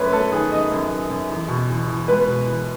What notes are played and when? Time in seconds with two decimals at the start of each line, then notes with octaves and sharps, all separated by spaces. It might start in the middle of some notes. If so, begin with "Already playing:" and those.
Already playing: F#2 A3 B4 C#5
0.12 A3 A4
0.31 D#3 G#4
0.52 F#2 D#5
0.71 F#2
0.90 F#2
1.10 F#2
1.30 E2
1.48 B2
1.69 E2
1.88 E2
2.08 G#3 B4
2.27 B2
2.46 E2